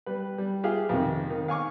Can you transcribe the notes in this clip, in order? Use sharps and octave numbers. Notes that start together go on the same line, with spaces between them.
G3 B4
G3
F4 G4 G#4 E5 F5
F2 C3 D#3
D#3
F5 G#5 C#6 D6